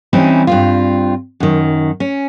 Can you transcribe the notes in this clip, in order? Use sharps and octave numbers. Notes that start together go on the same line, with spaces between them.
E3 G3 C4 C#4 D#4 E4
G2 C4 F4
F#2 D#3
C#4